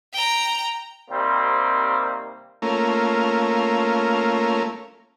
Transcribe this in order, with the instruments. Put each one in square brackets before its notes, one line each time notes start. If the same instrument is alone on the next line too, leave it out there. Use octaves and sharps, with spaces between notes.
[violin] G5 A#5
[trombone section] C3 D#3 G3 A#3 C4
[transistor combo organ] A3 A#3 C#4 F4 A#4